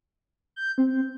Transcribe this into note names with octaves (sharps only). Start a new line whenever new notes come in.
G6
C4